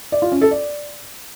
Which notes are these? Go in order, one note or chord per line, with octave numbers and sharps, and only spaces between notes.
D5
F4
C#4
A4
D5